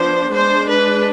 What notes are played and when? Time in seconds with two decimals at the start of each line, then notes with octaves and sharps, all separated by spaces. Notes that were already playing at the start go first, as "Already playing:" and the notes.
Already playing: F3 B3 D4 C5
0.35 G#3 D4 C5
0.70 B4